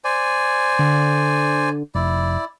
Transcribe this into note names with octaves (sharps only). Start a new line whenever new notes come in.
C5 D5 G#5
D3
F1 E4 D5